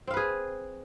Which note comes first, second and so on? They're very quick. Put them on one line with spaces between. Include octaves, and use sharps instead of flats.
C4 F5 B4 G#4